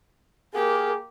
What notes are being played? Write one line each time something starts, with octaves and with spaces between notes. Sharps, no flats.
A#3 G4 G#4 A#4